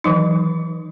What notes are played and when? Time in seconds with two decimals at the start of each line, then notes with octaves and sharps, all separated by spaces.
0.04 D#3 E3 F#3 D#4